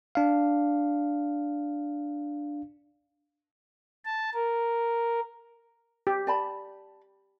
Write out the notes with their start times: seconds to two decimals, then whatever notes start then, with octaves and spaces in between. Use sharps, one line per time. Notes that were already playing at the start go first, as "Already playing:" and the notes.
0.15 D4 F5
4.05 A5
4.34 A#4
6.07 G4
6.27 D5 A5 B5